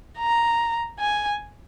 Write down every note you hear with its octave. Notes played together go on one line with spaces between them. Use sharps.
A#5
G#5